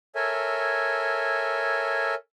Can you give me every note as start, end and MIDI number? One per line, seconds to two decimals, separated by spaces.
0.15 2.15 69
0.15 2.15 70
0.15 2.15 73
0.15 2.15 76
0.15 2.15 80